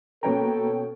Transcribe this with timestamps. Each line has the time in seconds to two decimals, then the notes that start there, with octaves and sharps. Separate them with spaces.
0.23 B2 A#3 C#4 A4 B4 G5 A#5